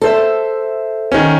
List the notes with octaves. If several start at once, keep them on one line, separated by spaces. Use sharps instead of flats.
A4 C5 E5
D#3 C#4